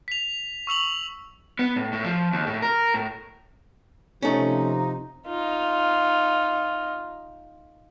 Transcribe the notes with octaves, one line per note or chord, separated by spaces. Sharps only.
B6 F7
C#6 E6 F7 F#7
B3
A2
A2
F3
D#2
A2
A#4
A2
C3 F3 A3 C#4 D#4
D#4 F4